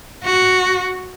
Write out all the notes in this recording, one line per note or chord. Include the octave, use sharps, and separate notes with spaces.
F#4